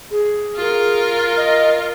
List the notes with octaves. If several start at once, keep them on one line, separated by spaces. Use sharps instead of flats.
G#4
F4 A#4
D#5